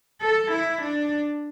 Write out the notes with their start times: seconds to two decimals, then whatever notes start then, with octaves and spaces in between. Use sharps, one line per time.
0.21 A4
0.51 E4
0.82 D4